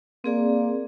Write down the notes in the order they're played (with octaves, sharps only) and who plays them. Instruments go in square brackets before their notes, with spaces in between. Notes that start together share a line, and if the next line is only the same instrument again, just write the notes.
[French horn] A#3 [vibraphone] C4 G#4 D5